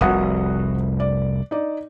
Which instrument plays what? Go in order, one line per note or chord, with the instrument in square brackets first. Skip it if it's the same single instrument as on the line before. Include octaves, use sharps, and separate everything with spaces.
[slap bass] F1 C2 [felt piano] F#4 F#5 D#6
[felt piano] D5
D#4 D5